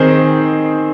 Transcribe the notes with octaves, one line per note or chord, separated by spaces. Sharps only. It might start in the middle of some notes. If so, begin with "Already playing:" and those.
Already playing: D#3 C4 D#4 G#4 C5